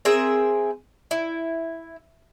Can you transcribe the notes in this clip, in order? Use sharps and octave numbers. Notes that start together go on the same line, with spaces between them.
C4 G#4 A#4 E5
E4